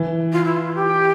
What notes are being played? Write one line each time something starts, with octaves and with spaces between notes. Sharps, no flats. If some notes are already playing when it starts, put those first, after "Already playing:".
Already playing: E3
F4
E4
F4
G4